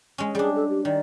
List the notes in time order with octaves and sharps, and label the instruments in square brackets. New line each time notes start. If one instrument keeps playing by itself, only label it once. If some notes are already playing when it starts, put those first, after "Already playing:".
[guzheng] G#3 C#4
[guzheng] G3 D4 [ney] G#4
[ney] A4
G4
[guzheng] D#3 [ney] D5